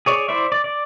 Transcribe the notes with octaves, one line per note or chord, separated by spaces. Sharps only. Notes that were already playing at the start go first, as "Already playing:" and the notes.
G#4 C#5 D5
E4 C5 D5 E5
D5
D5